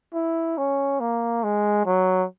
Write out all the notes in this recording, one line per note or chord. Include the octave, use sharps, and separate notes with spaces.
E4
C#4
A#3
G#3
F#3